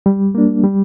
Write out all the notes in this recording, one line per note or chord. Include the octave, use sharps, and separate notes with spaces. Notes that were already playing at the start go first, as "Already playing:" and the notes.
G3
A#3 D4
G3